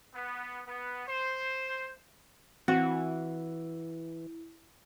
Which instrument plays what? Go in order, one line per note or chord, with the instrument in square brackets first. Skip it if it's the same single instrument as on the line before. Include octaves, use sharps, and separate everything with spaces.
[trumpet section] B3
B3
C5
[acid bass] E3 [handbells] C4 [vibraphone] E4 [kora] F#4